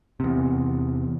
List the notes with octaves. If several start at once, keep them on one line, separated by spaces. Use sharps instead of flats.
E2 C3